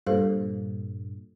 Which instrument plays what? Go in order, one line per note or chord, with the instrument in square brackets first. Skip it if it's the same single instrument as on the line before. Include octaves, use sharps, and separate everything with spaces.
[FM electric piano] G2 A#2 [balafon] A4 C5 F5